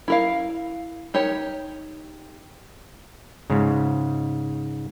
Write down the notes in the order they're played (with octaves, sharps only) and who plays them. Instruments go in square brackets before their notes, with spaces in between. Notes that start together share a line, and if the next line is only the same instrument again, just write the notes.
[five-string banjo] E4 A#4 F5
D#4 G4 A#4 C#5
[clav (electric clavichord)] G#2 C#3